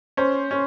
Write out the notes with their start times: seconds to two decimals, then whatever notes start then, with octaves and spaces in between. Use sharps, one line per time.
0.17 C#4 C5
0.51 C#4